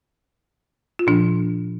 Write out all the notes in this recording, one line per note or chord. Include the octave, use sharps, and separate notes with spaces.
F4
A#2 F3 D4